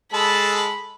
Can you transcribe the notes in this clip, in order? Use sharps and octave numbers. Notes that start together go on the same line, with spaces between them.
G#3 A4 A5 B5